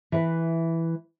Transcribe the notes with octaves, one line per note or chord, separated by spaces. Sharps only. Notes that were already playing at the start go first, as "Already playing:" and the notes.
E3 B4